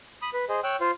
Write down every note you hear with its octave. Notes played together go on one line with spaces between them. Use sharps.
B5 D#6
B4
G#4 C5 D#5
C#5 G5 E6 F#6
F4 C5 F5